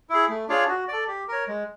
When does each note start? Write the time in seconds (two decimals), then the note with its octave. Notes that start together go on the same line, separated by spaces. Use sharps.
0.10 E4 G#4
0.29 A3
0.48 D4 F4 G#4 C#5
0.68 F#4
0.88 A4 D5
1.08 G4
1.28 A#4 C#5
1.48 G#3